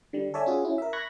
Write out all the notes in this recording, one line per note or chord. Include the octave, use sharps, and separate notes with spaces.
D3 G3
A4 C#5 D5 E5 G#5
C#4 F4 F#4 G#4
C#4 E4
A#4 E5
B5 C#6 F#6 G#6 A#6